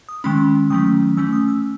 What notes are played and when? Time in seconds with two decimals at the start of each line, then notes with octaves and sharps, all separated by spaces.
0.09 D#6
0.24 D#3 G#3 C#4 B5
0.70 D#3 F#3 A3 C#4 D#6
1.17 E3 A3 C#4 E6
1.33 D#6
1.48 E6